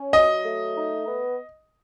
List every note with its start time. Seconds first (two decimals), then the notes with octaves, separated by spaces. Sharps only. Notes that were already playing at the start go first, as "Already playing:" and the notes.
Already playing: C#4
0.13 F#3 D#5
0.45 A3
0.77 D#4
1.07 B3